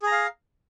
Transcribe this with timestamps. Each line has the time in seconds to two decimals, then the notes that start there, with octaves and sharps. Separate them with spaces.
0.02 G#4
0.07 A#5
0.12 F5